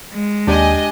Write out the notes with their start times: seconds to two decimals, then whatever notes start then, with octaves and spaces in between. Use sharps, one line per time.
0.13 G#3
0.47 D#2 D4 G4 D5 D#5 G#5